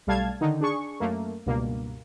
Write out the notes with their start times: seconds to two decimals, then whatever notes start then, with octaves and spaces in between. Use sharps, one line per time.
0.07 B1 G3 A3 F5 A5 G#6
0.41 D3 D#3 D#4
0.61 D4 G#4 C#6
1.00 F#2 A3 A#3
1.46 C#2 G2 B2 A#3